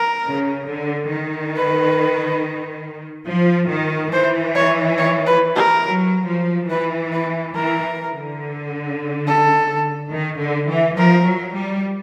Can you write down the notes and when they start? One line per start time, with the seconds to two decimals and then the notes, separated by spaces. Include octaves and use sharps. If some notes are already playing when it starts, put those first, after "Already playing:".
Already playing: A#4
0.27 C#3
0.70 D3
1.13 D#3
1.56 B4
3.27 F3
3.69 D#3
4.12 E3 C5
4.55 C#5
4.98 C#5
5.27 B4
5.56 A#4
5.84 F#3
6.26 F3
6.69 E3 B4
7.12 B4
7.55 E3 A#4
8.13 D3
9.27 A4
10.12 D#3
10.41 D3
10.69 E3
10.98 F3 A#4
11.26 F#3
11.55 G3